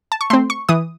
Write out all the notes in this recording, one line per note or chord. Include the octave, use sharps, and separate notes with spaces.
A5
C#6
A3 C4 C6
C#6
E3 D#6